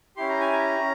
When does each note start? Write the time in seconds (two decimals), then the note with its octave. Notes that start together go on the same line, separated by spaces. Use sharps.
0.17 C#4 E4 G4 C6
0.29 A#5
0.41 G#5
0.53 A#5
0.79 C#4